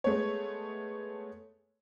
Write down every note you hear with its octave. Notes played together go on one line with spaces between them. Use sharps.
G#3 A3 B3 C#5